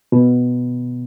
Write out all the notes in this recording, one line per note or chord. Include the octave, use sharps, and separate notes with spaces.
B2